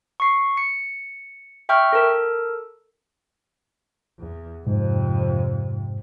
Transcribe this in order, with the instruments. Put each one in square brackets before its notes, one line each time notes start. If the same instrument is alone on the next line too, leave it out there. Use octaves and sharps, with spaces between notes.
[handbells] C#6 C7
C#7
E5 G5 C#6 F6 G6
A4 A#4
[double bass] E2
[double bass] F2 C3 [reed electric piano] G#2